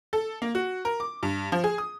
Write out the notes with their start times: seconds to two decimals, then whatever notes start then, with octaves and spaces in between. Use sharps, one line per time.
0.13 A4
0.42 A#3
0.55 F#4
0.85 A#4
1.00 D6
1.23 G2
1.52 F3
1.64 G#4
1.78 D#6